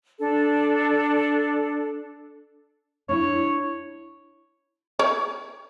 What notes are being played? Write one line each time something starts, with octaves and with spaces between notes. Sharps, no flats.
D4 A4
D4 E4 C#5
C#5